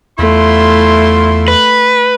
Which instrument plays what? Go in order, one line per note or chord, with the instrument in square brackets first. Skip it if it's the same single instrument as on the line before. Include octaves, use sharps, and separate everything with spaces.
[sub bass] E2 [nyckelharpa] A3 [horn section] E4 F4 C6
[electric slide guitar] B4